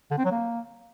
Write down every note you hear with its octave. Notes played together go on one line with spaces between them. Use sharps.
D3
C4
F#3
A#3